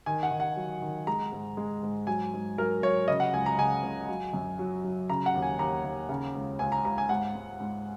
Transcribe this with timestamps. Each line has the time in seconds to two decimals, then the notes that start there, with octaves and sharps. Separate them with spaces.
0.06 D#3 G#5
0.23 F#5
0.31 D#3
0.40 F#5
0.56 F#3
0.82 D#3
1.07 G#3 A#5
1.32 G#2
1.57 G#3
1.83 G#2
2.07 F#3 G#5
2.33 G#2
2.58 F#3 A#4
2.82 F#3 C#5
3.08 C#3 D#5
3.20 F#5
3.33 C#2 G#5
3.46 A#5
3.58 C#3 G#5
3.83 C#2
4.09 F#3
4.34 F#2
4.59 F#3
4.84 F#3
5.10 C#3 A#5
5.26 F#5
5.34 D#2
5.42 G#5
5.59 D#2 A#5
5.85 D#2
6.09 C#3
6.35 C#2
6.59 C#2 G#5
6.72 A#5
6.85 C#2 A#5
6.98 G#5
7.09 G#2 F#5
7.34 G#2
7.60 G#2